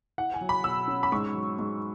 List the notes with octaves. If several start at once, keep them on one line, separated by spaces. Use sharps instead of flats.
E4 F#5
G#5
F#3
B5
B2 E6
C#4
B5
G#2 C#6
F#3
G#2